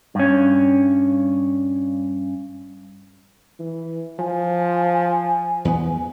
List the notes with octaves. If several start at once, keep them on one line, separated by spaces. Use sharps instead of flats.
G2 C#4
E3
F3 G#5
E2 E3 B3